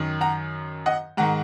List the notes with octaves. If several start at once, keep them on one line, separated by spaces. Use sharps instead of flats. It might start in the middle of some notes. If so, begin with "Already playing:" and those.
Already playing: F#2 D#3
F#5 A#5
D#5 F#5
G#2 D#3 F#5 A#5